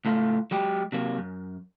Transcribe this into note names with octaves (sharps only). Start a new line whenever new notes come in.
C#2 A2 A3 F4
F#3 G#3 G4
C3 F#3 A#3
F#2